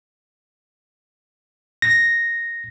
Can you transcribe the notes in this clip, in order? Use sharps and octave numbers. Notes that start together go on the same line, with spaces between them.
A#6